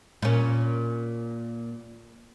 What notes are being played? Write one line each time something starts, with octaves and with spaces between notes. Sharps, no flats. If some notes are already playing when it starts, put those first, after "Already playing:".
A#2 C#4